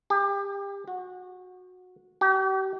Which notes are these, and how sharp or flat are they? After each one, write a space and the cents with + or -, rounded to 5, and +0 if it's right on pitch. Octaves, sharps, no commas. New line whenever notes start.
G4 +25
F#4 -20
G4 -45